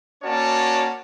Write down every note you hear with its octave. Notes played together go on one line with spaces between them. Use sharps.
A#3 C#4 F#4 C#5 D5 A5